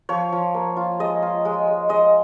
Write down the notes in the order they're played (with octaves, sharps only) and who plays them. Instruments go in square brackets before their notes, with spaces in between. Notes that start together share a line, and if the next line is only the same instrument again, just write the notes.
[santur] F3 C#5
F3
A#3
F4
G#3 D#5
F4
G#3
G#3
G#3 D#5